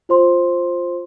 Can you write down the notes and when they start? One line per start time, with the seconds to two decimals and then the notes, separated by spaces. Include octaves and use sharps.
0.09 F4 C5 C6